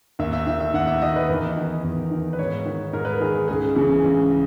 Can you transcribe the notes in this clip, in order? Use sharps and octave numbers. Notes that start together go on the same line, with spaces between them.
D#2 E5
E5
D#3 E5
E5
D#2 F#5
E5
D#3 D#5
B4
E2 A#4
D#3
E2
D#3
B4
G#2 C#5
D#3
G#2 A#4
B4
A#4
D#3 G#4
C#2 G#4
C#3 E3
C#2